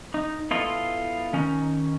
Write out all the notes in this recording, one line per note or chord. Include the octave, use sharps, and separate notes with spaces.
D#4
B3 E4 F4 A4 D#5
D#3 C#4 D#4